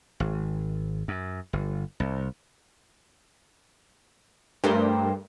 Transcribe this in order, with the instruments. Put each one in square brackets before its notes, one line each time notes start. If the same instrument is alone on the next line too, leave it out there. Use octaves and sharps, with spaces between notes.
[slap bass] G#1
F#2
G1
C2
[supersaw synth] G2 [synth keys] A3 A#4 [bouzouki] G4 C5 G5